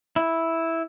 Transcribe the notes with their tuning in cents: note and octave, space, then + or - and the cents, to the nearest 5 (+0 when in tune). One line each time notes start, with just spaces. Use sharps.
E4 -5